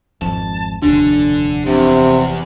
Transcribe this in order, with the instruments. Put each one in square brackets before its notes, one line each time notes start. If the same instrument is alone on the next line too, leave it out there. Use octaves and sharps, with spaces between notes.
[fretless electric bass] G#1 F2 [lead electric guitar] A5
[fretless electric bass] F1 D#2 [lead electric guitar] D3 [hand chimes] D4
[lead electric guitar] E2 [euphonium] C3